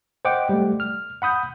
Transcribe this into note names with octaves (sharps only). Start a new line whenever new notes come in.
C5 D#5 F#5 G5 D6
G3 A3
F6
F#5 B5 D#6 G6